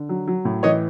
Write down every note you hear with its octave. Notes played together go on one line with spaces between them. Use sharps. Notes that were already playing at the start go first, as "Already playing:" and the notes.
Already playing: D3
F#3
F#3
A2
E3 C#5 D#5